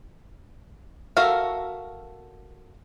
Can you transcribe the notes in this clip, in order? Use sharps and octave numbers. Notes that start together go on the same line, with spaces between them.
F#4 A4 A#4 E5 F5